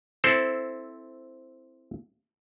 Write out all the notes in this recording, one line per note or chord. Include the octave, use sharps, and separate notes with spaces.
C4 E4 A4 C5